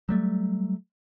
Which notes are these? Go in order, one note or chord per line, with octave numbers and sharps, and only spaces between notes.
F#3 G3 A3